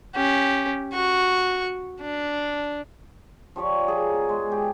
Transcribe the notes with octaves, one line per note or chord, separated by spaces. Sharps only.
C#4 G4
F#4 C#6
D4
F3 G4 C#5 D5
G#4 A#4
B2
G#3
G4